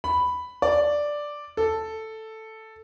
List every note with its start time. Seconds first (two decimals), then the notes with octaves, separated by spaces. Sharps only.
0.04 B5
0.62 D5
1.57 A4